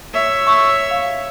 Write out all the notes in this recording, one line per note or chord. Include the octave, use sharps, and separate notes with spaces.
C#5 E5
C#6 E6
F5